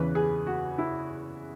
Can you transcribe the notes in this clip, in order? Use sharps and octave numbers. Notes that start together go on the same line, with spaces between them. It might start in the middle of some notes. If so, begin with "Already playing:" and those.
Already playing: E2 C#3 E3 B4
G#4
F#4
E4